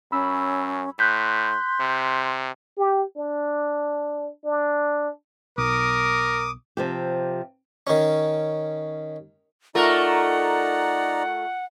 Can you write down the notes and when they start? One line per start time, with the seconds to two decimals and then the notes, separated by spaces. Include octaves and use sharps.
0.12 F#2 C#4 B5 E6
0.99 A2 C6 F#6 G6 B6
1.80 C3
2.78 G4
3.17 D4
4.45 D4
5.58 B1 A#4 D6 D#6
6.77 C3 F3 G4
7.87 D#3 C#4
9.75 A3 D#4 F4 A#4 D5 F#5 A#5 C#6